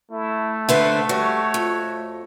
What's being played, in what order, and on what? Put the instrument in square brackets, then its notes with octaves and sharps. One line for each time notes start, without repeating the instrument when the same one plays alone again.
[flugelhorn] A3 [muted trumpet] E4
[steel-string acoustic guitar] D3 B4 C5 [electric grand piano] E5 [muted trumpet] F#5
[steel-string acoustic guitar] G3 [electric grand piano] F#4 [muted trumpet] C#5
[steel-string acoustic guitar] F2